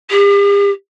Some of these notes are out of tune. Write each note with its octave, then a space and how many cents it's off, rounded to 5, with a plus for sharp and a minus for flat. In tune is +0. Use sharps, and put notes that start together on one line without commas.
G4 +45